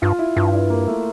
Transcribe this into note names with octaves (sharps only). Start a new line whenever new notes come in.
G2 F4
E4
G2 F4
E4
A#3
A3